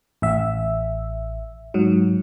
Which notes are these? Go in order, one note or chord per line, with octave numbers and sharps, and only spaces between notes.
A1 E5
G#2 F#3